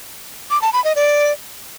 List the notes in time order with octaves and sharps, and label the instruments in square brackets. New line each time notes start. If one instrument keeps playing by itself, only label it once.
[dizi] D6
A5
B5
D#5
D5